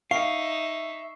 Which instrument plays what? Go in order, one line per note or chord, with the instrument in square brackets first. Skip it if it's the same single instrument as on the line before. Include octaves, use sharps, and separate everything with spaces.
[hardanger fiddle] D#4 [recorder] E5 [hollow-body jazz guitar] F5 [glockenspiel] C#6 C7